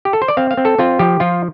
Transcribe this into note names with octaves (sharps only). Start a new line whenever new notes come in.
G4
A4
C5
D5
C4 F5
F5
C4
A4
C4 F4
F3 G4
F3 F4